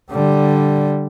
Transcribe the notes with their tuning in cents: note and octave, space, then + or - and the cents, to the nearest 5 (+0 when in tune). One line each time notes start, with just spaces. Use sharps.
D3 +0 G3 -5